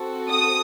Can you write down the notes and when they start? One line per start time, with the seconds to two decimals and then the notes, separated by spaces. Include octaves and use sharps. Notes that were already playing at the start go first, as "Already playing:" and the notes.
Already playing: C4 F#4 A4
0.30 D#6